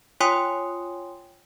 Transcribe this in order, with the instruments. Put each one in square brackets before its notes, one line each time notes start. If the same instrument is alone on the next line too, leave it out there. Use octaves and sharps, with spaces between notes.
[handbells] F4 C#5 G5 G#5 C6 D#6